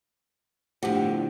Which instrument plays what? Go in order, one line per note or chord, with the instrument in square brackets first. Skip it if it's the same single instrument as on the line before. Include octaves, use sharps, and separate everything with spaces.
[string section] G1 D3 [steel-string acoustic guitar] A2 F3 [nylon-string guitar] G4 F#5